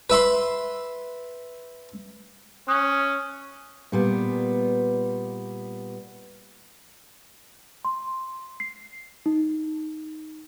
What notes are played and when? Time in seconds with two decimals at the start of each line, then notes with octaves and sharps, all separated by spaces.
0.10 B4 E5 B5 C6
2.68 C#4 D#6 F#6
3.92 A#2 G3 B3
7.85 C6
8.60 C7
9.26 D#4